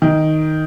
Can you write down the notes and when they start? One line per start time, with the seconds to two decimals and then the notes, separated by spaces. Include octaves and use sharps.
0.02 D#3